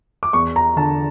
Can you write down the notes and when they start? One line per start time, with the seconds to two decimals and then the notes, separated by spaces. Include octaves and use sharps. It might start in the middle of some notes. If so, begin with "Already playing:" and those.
0.23 D6
0.33 E2 C#6
0.56 A#5
0.76 D3 A5